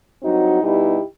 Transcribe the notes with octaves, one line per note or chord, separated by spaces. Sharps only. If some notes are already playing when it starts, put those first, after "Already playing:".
G2 F#3 C4 D#4 F#4
B2 G3 B3 D#4 E4 G4